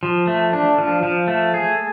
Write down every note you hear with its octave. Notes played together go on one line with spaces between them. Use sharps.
F3
A3
D4
F3
F3
A3
G#4